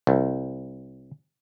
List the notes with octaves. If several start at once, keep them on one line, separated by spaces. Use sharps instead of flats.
C2